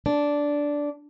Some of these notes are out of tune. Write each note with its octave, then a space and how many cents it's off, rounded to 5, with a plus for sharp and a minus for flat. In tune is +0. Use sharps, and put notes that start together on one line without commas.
D4 -10